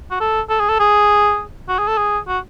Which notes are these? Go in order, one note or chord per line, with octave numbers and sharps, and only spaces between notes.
F#4
A4
A4
G#4
A4
G#4
F#4
G#4
A4
G#4
F#4